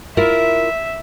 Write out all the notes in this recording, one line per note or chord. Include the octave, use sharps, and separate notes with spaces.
E4 F4 A#4 E5